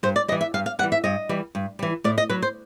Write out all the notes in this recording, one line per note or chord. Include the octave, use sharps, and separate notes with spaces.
G2 C5
D5
E3 G3 D#5
E5
G2 F5
F5
E3 G3 F#5
E5
G2 D#5
E3 G3
G2
E3 G3
A2 D5
D#5
F#3 B4
C5